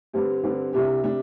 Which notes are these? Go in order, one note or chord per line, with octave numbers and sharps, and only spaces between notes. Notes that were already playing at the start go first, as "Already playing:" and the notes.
G2 D3 C4 G4
G2 D3 C4 G4
C2 C3 G3 D4 G4
C3 G3 D4 G4